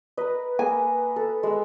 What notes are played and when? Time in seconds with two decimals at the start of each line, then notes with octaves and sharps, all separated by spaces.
0.17 A#4 B4 D#5
0.59 A#3 A#4 D#5 G#5
1.16 A4
1.43 G#3 E6